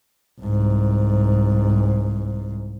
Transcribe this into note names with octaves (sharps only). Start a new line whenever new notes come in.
C2 G#2